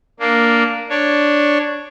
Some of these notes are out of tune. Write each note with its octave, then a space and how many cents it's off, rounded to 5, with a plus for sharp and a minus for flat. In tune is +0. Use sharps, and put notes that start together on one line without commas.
A#3 +0 D4 +0
D4 +0 C#5 +0